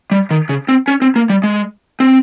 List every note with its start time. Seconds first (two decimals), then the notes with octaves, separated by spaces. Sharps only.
0.11 G3
0.31 D#3
0.49 C#3
0.69 C4
0.88 C#4
1.02 C4
1.16 A#3
1.30 G3
1.43 G#3
2.00 C4